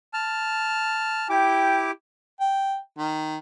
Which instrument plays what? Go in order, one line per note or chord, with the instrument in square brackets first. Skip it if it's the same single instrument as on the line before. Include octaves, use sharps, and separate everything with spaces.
[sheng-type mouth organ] A5 F6
[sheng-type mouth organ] E4 G4 D6 [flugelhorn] G5
[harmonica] G5
D#3